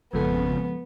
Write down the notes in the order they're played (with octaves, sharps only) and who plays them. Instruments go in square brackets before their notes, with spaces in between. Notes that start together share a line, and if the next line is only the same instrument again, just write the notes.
[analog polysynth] G#1 F2 C#3 [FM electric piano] F3 G#3 A4 [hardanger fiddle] B3